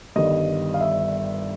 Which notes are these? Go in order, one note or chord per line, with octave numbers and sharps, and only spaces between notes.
G1 G2 D#3 G3 D#5
F5
E5